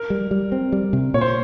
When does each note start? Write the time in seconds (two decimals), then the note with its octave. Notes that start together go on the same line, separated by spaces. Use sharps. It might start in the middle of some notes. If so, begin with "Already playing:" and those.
Already playing: A#4
0.10 G3
0.31 G3
0.52 C4
0.72 G3
0.93 C3
1.14 A#2 C#5
1.21 C5